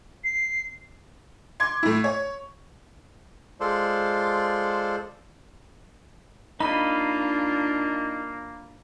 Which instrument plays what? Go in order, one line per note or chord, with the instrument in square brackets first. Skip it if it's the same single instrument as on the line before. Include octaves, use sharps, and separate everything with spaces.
[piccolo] C7
[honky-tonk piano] C6 D6 G#6
A2 E4
C#5
[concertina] G#3 F4 A4 C5 D5
[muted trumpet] A#3 [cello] D4 F4 [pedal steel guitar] D#4 D#5 [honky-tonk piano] B5